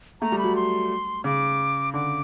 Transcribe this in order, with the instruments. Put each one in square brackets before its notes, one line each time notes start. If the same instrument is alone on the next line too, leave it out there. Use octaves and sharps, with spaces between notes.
[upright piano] A3 [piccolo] A#5
[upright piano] G3
[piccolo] B5
[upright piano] F#3
[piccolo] C6
[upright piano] C#3 [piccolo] D6
[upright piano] D3 [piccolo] D6